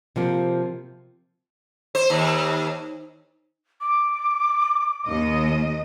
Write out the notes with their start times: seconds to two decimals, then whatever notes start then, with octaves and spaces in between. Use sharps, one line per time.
0.16 C3 F3 A#3
1.95 C5
2.10 D#2
3.81 D6
5.06 D#2 D#5